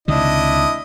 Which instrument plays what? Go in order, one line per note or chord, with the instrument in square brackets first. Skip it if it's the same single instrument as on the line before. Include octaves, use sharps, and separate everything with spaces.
[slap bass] C#2 C3 D#3 [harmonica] D4 E4 D#5